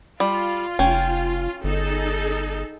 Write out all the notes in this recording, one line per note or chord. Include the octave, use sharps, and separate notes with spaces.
G3 F4
F1 C#4 G5
G1 D#4 G#4 A4